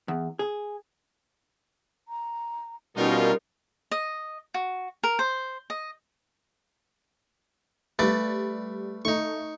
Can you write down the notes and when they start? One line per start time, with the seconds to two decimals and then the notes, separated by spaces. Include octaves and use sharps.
0.08 E2
0.39 G#4
2.08 A#5
2.97 B2 G3 C#4 D#4 F4 A#4
3.91 D#5
4.54 F#4
5.03 A#4
5.19 C5
5.70 D#5
7.99 G3 A3 B4 D6 A6
9.05 A3 D#4 C#6